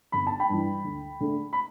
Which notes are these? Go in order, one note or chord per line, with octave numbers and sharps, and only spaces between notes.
G1 B5
A5
G5 B5
G2 E3
D2
D3 A3
B5